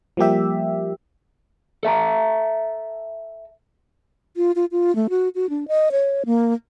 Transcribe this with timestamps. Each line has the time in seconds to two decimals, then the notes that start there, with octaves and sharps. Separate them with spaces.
0.17 F3 G3 A#3 G4 E5
1.83 A4 E5 A5 A#5
4.37 F4
4.56 F4
4.72 F4
4.96 A3
5.10 F#4
5.35 F#4
5.50 D4
5.68 D#5
5.92 C#5
6.26 A#3